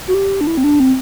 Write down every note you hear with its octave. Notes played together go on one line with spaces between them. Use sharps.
F#4
G4
D4
E4
C4
D4
C4